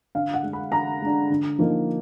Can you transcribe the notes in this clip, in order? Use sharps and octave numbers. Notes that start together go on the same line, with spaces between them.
D3 F5
F#5
G#3 D4
B5
D3 A#5
G#3 D4
D3
F3 A#3 D#4